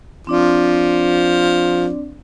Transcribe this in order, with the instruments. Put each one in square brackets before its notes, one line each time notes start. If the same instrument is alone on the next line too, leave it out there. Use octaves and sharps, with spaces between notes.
[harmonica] F3 [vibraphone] C4 D4 D5